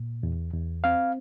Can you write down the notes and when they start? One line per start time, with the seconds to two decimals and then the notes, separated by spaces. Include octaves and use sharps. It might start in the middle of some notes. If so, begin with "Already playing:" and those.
Already playing: A#2
0.23 E2
0.53 E2
0.84 C4 F5